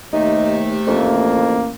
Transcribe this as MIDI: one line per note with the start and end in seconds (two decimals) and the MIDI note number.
0.13 0.77 39
0.13 1.42 48
0.13 1.42 57
0.13 0.62 63
0.87 1.74 33
0.87 1.61 41
0.87 1.74 58